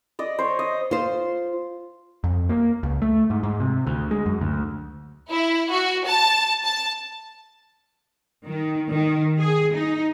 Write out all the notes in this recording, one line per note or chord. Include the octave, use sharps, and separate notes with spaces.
D5 D#5
C5 C#5
D#5
F4 C5
F2
A#3
C#2
A3
G#2
G#2
C3
D2
G#3
F#2
D2
E4
F#4
A5
A5
D#3
D#3
G#4
D#4